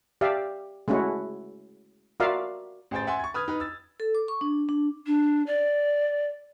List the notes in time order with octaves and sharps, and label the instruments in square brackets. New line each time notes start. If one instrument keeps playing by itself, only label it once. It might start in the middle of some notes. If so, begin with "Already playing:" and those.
[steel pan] G4 D5 E5 F5
G#3 A3 C#4 E4 F#4
F4 F#4 A#4 D5 E5 F5
[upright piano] A1 G#4 C5 G5 A6
E5 F#5 G#5 C6
C#6 G#6
B4 D#6 F6 G#6
D#4 B4
E6 A6
[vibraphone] A4
D6
C#6
D4
D4
[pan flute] D4
D5